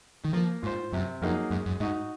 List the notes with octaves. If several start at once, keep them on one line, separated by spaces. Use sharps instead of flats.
D#3
F3 A#3
G#2 F4 C5
F#2 C3
F2 F#3 A#3 D#4 G#4
F#2 G#3
F#2
G#2 D#4 F#4